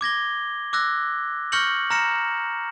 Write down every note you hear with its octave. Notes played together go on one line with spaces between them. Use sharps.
D6 G#6 A#6 G7
D6 E6 F#6 A#6
C#6 F6 G6 A#6 C#7 F#7
A#5 F6 A#6 C#7 E7